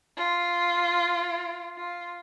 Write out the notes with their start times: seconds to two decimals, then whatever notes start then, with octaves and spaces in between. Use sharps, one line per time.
0.17 F4
1.77 F4